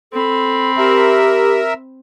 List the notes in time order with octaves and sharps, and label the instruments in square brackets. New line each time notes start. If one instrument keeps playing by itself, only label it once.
[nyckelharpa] C4 B5 [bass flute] A4
[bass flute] G4 [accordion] A#4 E5